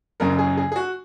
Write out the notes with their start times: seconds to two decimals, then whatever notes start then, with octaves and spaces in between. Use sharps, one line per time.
0.20 F#1 F#2 C#3 A#4
0.39 G#4
0.57 G#4
0.72 G#4
0.76 F#4